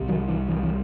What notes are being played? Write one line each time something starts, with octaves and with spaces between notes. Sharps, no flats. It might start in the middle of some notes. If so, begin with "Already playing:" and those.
Already playing: C2 C3
D#3 F#3
E3
E3
E3